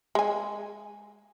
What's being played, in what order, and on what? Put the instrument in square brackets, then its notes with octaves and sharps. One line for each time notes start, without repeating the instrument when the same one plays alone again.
[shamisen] G#3 G#5